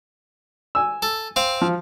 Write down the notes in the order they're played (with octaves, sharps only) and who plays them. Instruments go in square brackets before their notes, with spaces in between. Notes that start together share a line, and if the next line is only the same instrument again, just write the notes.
[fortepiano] G#5 E6
[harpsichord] A4
C4 F5
[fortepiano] F3